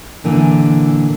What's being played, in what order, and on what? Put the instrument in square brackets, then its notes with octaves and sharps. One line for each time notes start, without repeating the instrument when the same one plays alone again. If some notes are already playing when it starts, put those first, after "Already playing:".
[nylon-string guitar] A#2 D3 E3